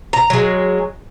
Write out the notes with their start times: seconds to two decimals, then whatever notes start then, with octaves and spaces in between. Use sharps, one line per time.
0.13 A#5
0.30 F#3 G#3